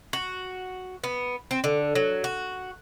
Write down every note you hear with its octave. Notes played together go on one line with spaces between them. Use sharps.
F#4
B3
C4
D3
F#3
F#4